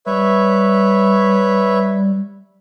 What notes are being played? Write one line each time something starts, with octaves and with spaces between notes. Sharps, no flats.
G3 B4 C#5 E5